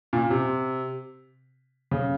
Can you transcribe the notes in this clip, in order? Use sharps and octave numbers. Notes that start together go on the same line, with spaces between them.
A#2
C3
C#3